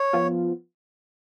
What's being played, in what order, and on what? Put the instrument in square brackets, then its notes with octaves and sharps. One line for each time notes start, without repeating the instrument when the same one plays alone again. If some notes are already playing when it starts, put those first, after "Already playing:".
Already playing: [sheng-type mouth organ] C#5
[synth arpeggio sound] F3 B3 F4